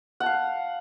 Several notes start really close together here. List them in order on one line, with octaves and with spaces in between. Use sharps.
F#5 A5 F5